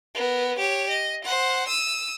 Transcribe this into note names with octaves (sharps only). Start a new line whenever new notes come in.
B3 A#4
G4 C#5
D#5
C5 F#5
D#6 E6